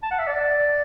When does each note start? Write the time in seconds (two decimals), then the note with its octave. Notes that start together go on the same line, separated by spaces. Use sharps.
0.03 A5
0.11 F#5
0.19 E5
0.27 D5